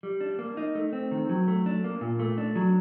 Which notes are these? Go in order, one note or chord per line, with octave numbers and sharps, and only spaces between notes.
G3
D4
A#3
D#4
A3
C4
D#3
F#3
A3
D4
A#3
A#2
A3
D4
F#3